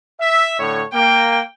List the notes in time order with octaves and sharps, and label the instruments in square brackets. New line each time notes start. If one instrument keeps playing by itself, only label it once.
[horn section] E5
A2 D3 C#5
[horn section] A#3 [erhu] G5